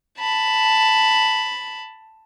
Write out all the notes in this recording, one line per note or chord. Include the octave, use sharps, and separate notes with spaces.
A5 B5